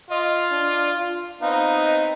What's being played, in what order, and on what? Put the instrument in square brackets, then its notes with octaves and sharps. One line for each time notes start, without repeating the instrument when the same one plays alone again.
[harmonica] F4 [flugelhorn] D#5
[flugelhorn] D4
F4
[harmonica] B3 C4 D#4 [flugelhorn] F5
[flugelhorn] D#5